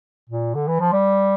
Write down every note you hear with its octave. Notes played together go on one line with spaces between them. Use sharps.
A#2
D3
E3
F3
G3